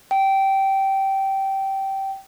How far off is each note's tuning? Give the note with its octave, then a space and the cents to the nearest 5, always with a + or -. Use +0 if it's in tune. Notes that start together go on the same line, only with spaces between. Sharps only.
G5 -15